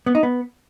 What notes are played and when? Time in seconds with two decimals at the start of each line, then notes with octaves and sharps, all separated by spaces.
0.06 B3
0.15 D#4
0.23 B3